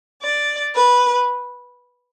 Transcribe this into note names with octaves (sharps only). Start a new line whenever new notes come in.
D5
B4